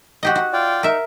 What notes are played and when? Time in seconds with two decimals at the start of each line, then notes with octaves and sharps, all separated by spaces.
0.23 F#4 G4 D#5
0.35 F#4
0.53 F4 D5 G5
0.83 D#4 A#4 E5